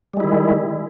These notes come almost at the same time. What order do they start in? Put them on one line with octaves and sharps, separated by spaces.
G3 G#3 E4 D#3